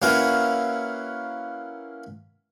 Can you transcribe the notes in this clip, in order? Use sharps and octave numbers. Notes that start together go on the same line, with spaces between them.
A#3 C#4 E4 F#4 A#4 B4